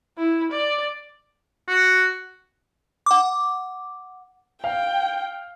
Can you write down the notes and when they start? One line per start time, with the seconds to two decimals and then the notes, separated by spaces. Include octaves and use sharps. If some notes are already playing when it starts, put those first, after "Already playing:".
0.18 E4
0.51 D5
1.68 F#4
3.06 F#5 D6
4.64 F5 G5